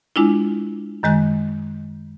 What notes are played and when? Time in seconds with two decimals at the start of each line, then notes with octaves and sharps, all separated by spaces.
0.16 G#3 D4 E4 F4
1.03 F#2 D#3 G#3 F#6